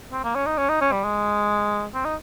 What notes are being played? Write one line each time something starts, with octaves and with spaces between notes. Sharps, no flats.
C4
A#3
C#4
D#4
C#4
D#4
C#4
G3
G#3
C4
D#4